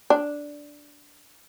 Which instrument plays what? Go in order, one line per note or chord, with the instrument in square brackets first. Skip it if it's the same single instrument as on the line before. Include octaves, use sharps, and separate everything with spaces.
[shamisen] D4